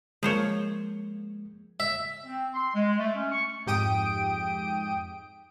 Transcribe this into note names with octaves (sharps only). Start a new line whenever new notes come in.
F3 G#3 A#3 C5 C#5
E5
C4
C6
G#3
A3
C#4
C#6
F2 G#2 G4 G5 D#6 D7